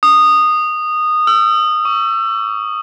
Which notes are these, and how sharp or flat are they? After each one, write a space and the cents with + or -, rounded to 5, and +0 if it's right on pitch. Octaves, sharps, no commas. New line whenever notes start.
D#6 -15
E6 +30
C#6 +30